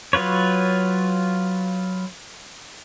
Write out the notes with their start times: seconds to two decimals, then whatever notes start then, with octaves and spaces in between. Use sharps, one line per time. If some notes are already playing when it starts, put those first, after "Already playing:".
0.13 F#3 F4 B4 C#5